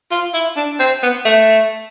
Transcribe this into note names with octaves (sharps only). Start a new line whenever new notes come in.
F4
E4
D4
C4
B3
A3